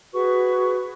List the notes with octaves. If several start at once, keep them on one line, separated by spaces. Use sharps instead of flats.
F#4 G#4 B4 C#6